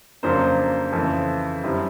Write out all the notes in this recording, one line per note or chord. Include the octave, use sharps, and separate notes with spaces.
F2 C#3 F#3 A#3 D4 C5
F2 C#3 E3 A3
F#2 D3 G3 C4 E4